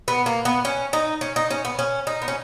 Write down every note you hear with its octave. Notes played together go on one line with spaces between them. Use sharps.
B3
A#3
B3
C#4
D#4
C#4
D#4
C#4
B3
C#4
D#4
B3
C#4